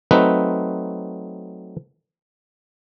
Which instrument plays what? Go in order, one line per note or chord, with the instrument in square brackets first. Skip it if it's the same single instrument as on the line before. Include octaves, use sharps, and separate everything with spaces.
[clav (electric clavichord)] F#3 A3 C4 D#4 B4